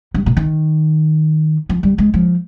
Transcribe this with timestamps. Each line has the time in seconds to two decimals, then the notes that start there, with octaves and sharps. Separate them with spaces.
0.14 G2
0.26 A#2
0.37 D#3
1.69 F3
1.83 G3
1.98 G#3
2.14 F3